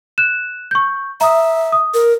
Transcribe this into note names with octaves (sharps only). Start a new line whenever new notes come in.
F#6 E7
C#6 G6
E5 A#5 D#6
D#6
A#4